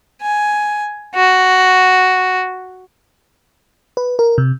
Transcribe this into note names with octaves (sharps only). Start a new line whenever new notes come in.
G#5
F#4
B4
A#4
C3